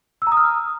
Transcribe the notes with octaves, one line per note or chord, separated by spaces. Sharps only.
E6
A#5
D#6
F6